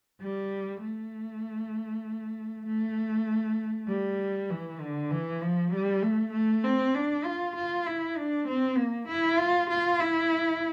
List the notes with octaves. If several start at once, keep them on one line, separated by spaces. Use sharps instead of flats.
G3
A3
A3
G3
E3
D3
E3
F3
G3
A3
A3
C4
D4
F4
F4
E4
D4
C4
A#3
E4
F4
F4
E4